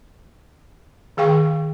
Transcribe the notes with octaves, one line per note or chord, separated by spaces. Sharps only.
D#3 G#4 F5 G5 C#6